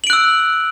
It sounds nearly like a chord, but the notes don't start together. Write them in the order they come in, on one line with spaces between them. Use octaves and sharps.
F#7 D7 F#6 E6